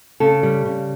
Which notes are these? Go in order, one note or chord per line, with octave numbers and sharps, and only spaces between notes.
C#3 A4
G3
C#3